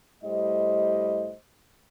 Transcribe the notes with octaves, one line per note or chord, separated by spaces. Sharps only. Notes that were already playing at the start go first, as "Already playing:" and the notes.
A2 G3 C5 D#5